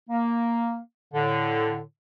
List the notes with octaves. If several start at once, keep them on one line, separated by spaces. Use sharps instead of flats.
A#3
A2 D3